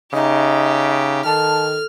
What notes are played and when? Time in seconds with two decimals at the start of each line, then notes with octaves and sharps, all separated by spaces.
0.13 C#3 D#4 G4 D#5 E5 A#5
1.25 D#3 A4 A5 F6